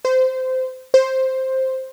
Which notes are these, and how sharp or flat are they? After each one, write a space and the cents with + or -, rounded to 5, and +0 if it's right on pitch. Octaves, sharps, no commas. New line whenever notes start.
C5 -20
C5 +5